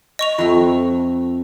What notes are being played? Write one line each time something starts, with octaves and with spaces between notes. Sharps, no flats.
D#5 C#6 F7
F2 A3 F4